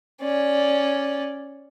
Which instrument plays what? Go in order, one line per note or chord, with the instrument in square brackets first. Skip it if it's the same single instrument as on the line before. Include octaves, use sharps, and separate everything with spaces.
[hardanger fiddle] C#4 D5